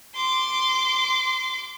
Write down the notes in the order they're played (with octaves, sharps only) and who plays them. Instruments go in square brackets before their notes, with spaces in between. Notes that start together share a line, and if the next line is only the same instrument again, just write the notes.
[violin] C6 D6